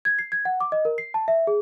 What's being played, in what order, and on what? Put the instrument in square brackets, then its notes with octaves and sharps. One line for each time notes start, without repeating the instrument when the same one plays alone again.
[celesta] G#6
C7
G#6
F#5
D6
D#5
A#4
C7
A5
E5
G#4